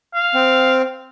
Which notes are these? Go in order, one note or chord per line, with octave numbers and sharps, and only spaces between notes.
F5
C4